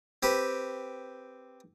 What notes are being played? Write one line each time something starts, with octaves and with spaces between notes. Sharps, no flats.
C4 G4 B4